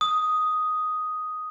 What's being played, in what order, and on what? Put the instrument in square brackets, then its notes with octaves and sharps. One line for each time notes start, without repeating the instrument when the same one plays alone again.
[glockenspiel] D#6